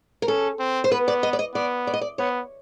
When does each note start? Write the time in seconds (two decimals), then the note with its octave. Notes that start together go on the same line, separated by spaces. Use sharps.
0.22 A#4
0.28 C#4 A4
0.59 C4
0.84 C5
0.91 B3 B4
1.08 D5
1.23 D#5
1.33 D5
1.39 D#5
1.55 B3 D5
1.87 D5
1.93 D#5
2.01 D5
2.18 B3 C#5